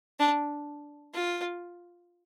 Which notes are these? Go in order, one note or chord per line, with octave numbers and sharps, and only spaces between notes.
D4
F4